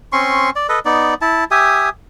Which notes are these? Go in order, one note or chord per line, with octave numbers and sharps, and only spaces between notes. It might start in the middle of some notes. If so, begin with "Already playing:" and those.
C4 C#4 C6 C#6
D5
A4 B4 D#5
B3 D#4 D5
E4 A5
G4 E5 G#5 D#6